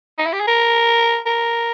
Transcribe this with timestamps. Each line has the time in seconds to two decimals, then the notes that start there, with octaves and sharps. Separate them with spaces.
0.18 D#4
0.26 E4
0.33 G4
0.40 G#4
0.48 A#4
1.26 A#4